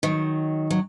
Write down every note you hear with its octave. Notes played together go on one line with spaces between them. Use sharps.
D#3 F#3
F#3